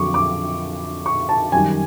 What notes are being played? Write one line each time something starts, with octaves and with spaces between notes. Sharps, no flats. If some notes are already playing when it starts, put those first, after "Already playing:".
Already playing: F2 D3 F#3 C#6 D6
D6
C#6
A5
F#2 D#3 G3 G#5